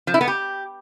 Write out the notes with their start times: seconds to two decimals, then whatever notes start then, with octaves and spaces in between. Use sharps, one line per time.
0.07 F3
0.14 E4
0.21 B3
0.27 G4